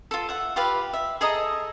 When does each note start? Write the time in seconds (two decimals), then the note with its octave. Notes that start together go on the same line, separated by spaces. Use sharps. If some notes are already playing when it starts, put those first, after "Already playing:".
0.11 F4 A4
0.29 E5 F#5
0.56 F4 G4 B4 F5
0.93 E5
1.21 G#4 A4 D#5 A#5